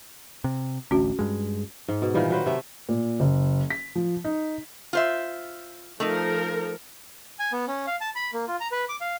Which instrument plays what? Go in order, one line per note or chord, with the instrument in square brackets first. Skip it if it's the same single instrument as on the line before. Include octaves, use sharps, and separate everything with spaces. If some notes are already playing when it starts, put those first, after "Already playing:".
[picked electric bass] C3
[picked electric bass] A1 D2 [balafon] C#4 F#4
[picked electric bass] G2 G#3
[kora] G#2
B2
A#2 D#3 E3 G3
F#3 B4 C5
C3 A3 E5
[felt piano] A#2
F#1
B6
F3
D#4
[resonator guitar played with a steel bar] F4 C5 E5
[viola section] F3 A4 A#4 [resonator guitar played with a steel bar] A3 D#4
[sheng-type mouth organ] G#5
B3
C#4
F5
A5
B5
A#3
F4
A#5
B4
D6
F5